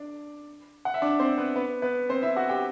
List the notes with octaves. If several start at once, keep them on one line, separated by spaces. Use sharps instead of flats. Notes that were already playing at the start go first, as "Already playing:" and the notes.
Already playing: D4 D5
F#5
E5
D4 D5
C4 C5
B3 B4
B3 B4
B3 B4
C4 C5
E4 E5
F#4 F#5
G4 G5